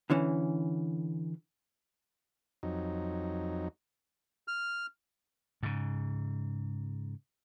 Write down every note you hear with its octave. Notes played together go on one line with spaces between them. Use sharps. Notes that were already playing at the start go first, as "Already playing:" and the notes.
D3 E3 C#4
F2 F#3 D#4
F6
G#2 C#3